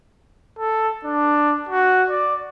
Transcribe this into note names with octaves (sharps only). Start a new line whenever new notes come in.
A4
D4
F#4
D5